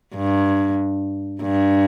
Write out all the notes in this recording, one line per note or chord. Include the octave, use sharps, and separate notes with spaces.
G2
G2